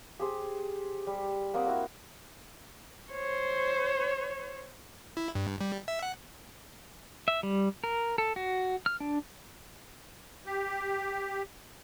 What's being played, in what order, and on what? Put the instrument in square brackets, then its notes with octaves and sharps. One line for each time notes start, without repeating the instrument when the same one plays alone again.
[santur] G4 G#4 C5
G3
A#3 C4 F#5 D#6
E4 F#4 A#4 F#5
[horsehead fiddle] C5 C#5
[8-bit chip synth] E4
G2
G3
E5
F#5
[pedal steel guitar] E5
G3
A#4
A4
F#4
F6
D4
[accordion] G4